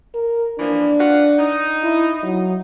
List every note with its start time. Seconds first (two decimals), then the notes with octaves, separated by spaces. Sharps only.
0.14 A#4
0.59 E3 F3 A#3 D4
0.99 F4 B4 F#5
1.39 D#4
1.84 E4
2.23 F#3